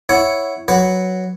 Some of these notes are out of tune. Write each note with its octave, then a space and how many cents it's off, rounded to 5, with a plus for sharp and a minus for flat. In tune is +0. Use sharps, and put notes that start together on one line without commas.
E4 +0 C#5 +0 F#5 +0
F#3 +0 B4 +0 F#5 +0